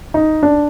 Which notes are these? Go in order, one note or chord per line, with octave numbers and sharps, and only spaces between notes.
D#4
D4